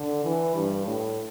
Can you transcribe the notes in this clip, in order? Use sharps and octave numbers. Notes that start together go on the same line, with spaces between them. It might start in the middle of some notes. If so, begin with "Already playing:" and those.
Already playing: D3
E3
G2
A2